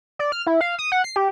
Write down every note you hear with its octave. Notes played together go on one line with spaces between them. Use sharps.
D5
F6
E4
F5
D#6
F#5
C7
G4